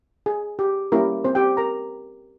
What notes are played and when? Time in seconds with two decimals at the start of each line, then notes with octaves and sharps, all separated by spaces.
0.26 G#4
0.59 G4
0.92 G3 A#3 C#4 E4 G4 A#4
1.24 C4 C5
1.35 G4 G5
1.57 A#4 A#5